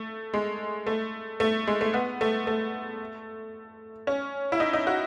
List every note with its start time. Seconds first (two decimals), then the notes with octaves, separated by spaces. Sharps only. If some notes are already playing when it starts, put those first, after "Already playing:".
Already playing: A3
0.34 G#3
0.87 A3
1.40 A3
1.67 G#3
1.81 A3
1.94 B3
2.21 A3
2.47 A3
4.07 C#4
4.52 E4
4.60 D#4
4.73 D#4
4.87 F#4